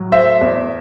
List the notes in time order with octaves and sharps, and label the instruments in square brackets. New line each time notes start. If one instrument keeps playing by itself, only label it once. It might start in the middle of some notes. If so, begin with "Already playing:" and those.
Already playing: [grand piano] A2 F#3
A3 C5 E5
E2